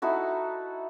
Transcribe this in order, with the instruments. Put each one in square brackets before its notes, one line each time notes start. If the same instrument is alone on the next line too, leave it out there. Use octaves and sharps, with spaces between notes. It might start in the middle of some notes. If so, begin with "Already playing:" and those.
[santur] D#4 E4 F#4 A4